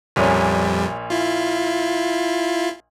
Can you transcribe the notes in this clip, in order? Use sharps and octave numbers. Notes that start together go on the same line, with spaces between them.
A#1 F2 A#2 G3 C#4
E4 F4